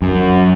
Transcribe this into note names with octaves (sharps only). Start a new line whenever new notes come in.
F#2